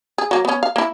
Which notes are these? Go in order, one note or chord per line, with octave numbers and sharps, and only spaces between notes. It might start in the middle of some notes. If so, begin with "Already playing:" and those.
G#4
F#3 A#3
B3 C#4
F5
A#3 E4